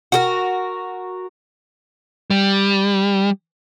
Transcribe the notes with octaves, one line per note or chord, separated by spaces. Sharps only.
F#4 G4 A#4
G3